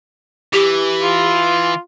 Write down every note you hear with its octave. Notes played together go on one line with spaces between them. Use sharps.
E3 G4
F4